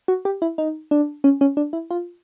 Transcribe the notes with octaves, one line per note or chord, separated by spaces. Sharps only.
F#4
G4
E4
D#4
D4
C#4
C#4
D4
E4
F4